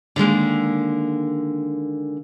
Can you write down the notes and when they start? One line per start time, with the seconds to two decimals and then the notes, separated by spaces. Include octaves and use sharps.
0.16 D3 D#3 G#3 A#3